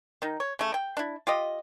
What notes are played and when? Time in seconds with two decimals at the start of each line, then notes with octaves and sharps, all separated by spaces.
0.22 D#3 D#4
0.40 C#5
0.59 C#3 A3
0.74 G5
0.97 D4 E4
1.27 F4 G4 D#5